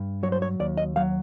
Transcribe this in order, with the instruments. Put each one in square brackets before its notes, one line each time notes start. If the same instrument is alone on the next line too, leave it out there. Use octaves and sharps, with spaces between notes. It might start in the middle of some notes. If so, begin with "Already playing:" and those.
Already playing: [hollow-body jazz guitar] G2
F#3 C#5
C5
C#5
D#2 D5
D#5
F#3 F5